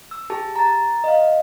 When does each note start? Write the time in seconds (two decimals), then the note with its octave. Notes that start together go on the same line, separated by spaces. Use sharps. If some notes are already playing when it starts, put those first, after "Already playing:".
0.11 E6
0.30 G4 G#4 A5
0.56 A#5 A6
1.04 D#5 F5